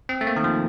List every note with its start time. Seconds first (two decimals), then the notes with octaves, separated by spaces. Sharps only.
0.09 C4
0.21 A3
0.27 A#3
0.36 D#3
0.44 F3